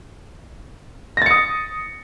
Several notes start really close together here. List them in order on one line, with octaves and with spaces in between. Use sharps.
A#6 A6 C#7 D#6